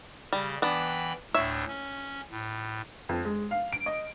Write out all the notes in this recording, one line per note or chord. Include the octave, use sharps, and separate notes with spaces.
C#3 G3
E3 B3 D4 G5 B5
D2 A2 D4 C#5 E5
C#4
A2
F2
G#3
F5
D7
D#5